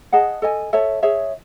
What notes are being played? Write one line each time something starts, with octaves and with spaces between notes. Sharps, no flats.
G#4 D#5 F#5 A5
A4 D#5 G#5
A4 C#5 E5 A5
G#4 C#5 E5